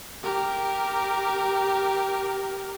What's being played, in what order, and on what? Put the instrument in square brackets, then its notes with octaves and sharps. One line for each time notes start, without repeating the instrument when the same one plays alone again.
[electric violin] G4 A#4